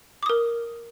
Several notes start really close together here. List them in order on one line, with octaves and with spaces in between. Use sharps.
D6 D#6 A#4